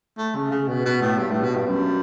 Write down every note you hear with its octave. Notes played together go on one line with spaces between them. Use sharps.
A3
C#3
C#3
B2
B2
A2
G2
A2
B2
G2
F#2